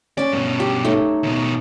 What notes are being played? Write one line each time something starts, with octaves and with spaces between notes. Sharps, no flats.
C#4 D5 G#5
G2 B2
G4
A3 D#4 C#5
D#2 B2